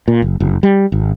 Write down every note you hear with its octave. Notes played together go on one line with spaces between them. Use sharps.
A#2
F#1
F#1
G3
G#1